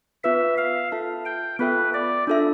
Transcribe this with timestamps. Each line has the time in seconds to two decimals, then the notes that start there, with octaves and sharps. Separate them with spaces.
0.24 B3 F4 B4 E5
0.57 F5
0.92 F4 A4 E5 A5
1.26 G5
1.59 B3 F4 A4 B4 E5 G5
1.94 D5
2.27 D4 F4 A4 E5